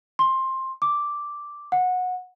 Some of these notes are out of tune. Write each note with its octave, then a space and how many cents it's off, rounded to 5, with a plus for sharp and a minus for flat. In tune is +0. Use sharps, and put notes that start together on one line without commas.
C6 +15
D6 +0
F#5 -20